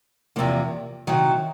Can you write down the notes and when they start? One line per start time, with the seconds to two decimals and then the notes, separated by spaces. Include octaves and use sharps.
0.36 E2 C3 F3 A#3
1.07 C3 D#3 F#3